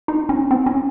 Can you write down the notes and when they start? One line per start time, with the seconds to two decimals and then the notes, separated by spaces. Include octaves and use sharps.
0.08 D#4
0.29 C#4
0.51 C4
0.66 C#4